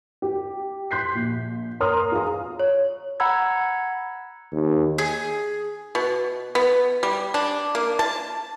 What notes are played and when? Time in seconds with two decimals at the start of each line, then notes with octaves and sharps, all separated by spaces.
0.22 G4
0.91 C6 F#6 G6 B6 C7
1.15 A#1
1.80 A#4 C#5 A#5 C6 D#6 F6
2.12 F4 G#4 F5 A#5
2.60 C#5
3.20 F#5 A#5 B5 E6 G#6
4.52 D#2
4.98 G#4
5.95 B2
6.55 B3
7.03 G3
7.34 D4
7.75 A#3
7.99 A5